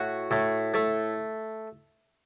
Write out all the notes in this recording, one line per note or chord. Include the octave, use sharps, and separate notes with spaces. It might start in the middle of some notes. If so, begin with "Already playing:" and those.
Already playing: A2 F#4
A2
A3